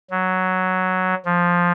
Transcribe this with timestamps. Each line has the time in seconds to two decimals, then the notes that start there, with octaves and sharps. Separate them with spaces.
0.10 F#3
1.25 F3